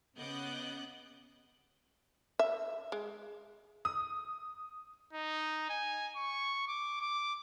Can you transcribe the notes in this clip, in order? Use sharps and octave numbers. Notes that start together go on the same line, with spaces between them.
C#3 B3 D#5 D6 F#6 G6
E5
G#3
D#6
D#4
G#5
C#6
D6
D6